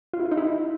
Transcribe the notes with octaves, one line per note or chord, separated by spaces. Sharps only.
F4
E4
F4
D#4
E4